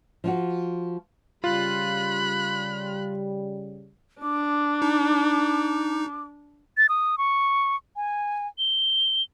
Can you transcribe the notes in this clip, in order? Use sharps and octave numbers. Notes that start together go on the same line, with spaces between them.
F3 F4 F#4
C#3 G3 F4 B5 F#6
D4 D6
D#4
A6
D#6
C#6
G#5
G7